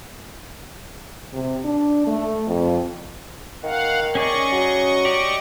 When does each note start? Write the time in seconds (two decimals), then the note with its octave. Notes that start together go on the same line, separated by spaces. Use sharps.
1.33 C3
1.64 D4
2.06 A3
2.47 F2
3.63 D#3 F5 F#5
4.15 C#4 G#4 D5 D#5 C#6
4.52 F#3
5.05 G4 D5